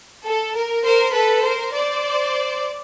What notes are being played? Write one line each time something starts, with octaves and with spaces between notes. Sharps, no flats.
A4
A#4
A#4 C5
A4 B4
A#4 C5
C5 D5